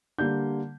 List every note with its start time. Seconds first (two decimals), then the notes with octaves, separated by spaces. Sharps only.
0.18 D3 G3 A#3 G6